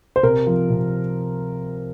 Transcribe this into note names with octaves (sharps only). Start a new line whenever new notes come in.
C5
C3 A#4
F3
C3